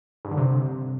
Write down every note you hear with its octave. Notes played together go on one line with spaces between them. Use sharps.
G2
D3
C3